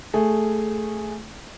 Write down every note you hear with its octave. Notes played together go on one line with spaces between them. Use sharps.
A3 G#4